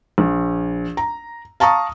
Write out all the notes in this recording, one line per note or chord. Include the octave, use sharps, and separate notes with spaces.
A#1
A#5
F5 A5 A#5 C#6 D#6